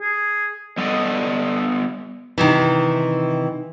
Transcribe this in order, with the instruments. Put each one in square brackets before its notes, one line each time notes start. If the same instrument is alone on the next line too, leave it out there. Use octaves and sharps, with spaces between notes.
[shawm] G#4
[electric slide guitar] G3 B3 A4 D5 D#5
[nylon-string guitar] C3 D#3 E3